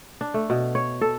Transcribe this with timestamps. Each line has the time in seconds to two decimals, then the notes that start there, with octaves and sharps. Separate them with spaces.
0.21 D4
0.34 A3
0.50 B2
0.75 C#5
1.01 A4